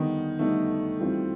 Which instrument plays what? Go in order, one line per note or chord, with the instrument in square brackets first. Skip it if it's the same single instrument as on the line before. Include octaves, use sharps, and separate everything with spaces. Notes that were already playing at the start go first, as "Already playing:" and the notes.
Already playing: [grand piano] D3 G3 B3 D#4 [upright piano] D#3
[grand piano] D3 G3 B3 D#4 [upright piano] A3
[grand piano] E3 G3 C4 F4